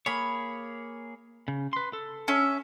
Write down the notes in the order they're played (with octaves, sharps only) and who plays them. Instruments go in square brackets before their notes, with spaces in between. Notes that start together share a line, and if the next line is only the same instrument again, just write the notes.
[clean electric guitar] A#3 G#4 C#5 [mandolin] B5
[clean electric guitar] C#3
B4 C6
A4
[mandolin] C#4 E5